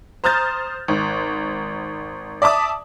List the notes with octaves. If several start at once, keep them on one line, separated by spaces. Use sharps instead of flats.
C5 A#5 D#6 F6 G6 A6
G#1
D5 E5 A5 D6 D#6